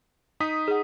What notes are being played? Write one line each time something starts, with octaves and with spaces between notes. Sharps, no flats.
D#4 D#6 B6
G#4 F#5